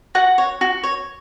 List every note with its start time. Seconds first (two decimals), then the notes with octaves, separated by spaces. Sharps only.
0.15 F#4 F#5
0.38 C#5
0.61 F#4
0.83 C#5